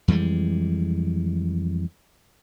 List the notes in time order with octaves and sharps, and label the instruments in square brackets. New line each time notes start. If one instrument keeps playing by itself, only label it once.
[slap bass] F2 E3 G3 G#3